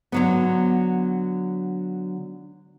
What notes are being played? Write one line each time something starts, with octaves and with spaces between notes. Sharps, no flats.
D3 F#3 B3